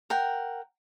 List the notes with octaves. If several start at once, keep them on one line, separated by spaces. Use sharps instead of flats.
A#4 F#5 G5